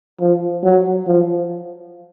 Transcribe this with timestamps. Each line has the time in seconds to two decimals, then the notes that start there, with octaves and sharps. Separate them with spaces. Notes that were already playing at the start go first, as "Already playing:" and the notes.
0.20 F3
0.63 F#3
1.07 F3